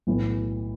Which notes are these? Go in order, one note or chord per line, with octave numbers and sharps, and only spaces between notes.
B1 A2 E3